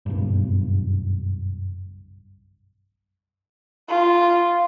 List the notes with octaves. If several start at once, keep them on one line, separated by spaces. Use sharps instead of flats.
F#1 B1 G2
F4